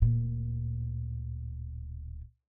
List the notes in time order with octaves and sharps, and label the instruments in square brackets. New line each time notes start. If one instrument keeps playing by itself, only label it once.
[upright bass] D1 A#2